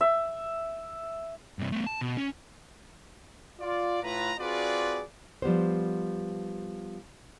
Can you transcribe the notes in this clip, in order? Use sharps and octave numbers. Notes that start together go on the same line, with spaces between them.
E5
G2 C3
A3 B3
A5
B2
C#4
F4 D5
A2 F4 B4 A#5
C4 F4 F#4 G#4 B4 D5
F3 G3 B3 C5